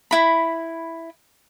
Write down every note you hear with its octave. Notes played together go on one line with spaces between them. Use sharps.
E4 B5